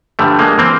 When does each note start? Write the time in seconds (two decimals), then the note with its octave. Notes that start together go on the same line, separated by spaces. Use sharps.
0.19 G2 D3 F3 G3 A3
0.39 G#3 A#3
0.58 E3 A#3 C4